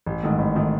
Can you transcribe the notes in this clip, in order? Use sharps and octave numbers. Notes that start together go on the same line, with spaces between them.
A1
G#2 D#3 A3
A1
D#3 A3